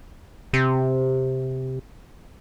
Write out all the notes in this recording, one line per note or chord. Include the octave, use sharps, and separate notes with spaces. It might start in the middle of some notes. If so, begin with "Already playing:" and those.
C3